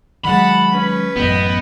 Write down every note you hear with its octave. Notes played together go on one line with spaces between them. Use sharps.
D#3 F#3 G#3 F#5 A5 B5
C#4 B4
A1 F#2 B3 D#5 G5